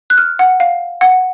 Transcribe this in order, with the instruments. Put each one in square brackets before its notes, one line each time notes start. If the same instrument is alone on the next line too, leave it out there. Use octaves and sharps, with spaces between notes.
[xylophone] F#6
F6
F#5
F5
F#5